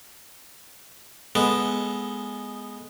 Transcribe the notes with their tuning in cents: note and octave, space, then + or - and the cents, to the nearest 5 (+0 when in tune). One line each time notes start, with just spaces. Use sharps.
G#3 +0 B3 +0 A4 +0